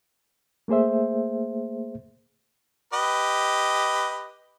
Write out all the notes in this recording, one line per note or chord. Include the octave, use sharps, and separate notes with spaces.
A3 A#3 G#4 C5 E5
G4 B4 D#5